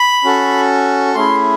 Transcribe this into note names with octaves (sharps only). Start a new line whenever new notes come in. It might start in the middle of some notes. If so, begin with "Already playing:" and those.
Already playing: B5
C#4 F#4 A4
A3 C#4 E4 G#4 C6